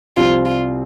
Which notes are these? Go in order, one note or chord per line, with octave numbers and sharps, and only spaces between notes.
C2 C3 F3 C4 F4
F4